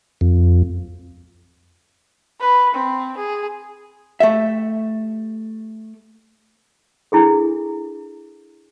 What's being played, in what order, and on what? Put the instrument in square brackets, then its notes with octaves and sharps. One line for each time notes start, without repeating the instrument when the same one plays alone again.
[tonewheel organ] F2
[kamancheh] B4
C4
G#4
[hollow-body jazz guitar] A3 G4 E5
[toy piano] D4 E4 G#4 A4